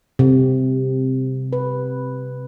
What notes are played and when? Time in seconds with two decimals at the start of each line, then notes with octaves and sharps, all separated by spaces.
0.19 C3
1.53 B4